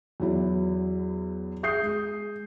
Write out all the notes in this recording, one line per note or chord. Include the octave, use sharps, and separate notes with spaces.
E2 F#3 E4
G#4 E5 D#6 G6 C7
G#3